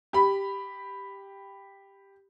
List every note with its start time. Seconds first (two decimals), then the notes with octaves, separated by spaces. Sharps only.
0.13 G4 B5